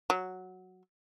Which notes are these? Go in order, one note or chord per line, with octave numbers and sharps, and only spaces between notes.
F#3